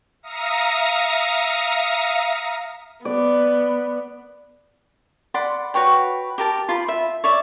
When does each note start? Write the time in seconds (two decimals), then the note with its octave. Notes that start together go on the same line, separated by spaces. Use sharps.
0.23 E5 F5 A#5 D#6 A#6 C#7
3.05 B3 D5
5.34 D5 F#5 B5 C6
5.74 F#4 B4 C#5 G5
6.38 G4 A#4 A5
6.69 F4 B5
6.88 E5
7.24 C#5 D5 E5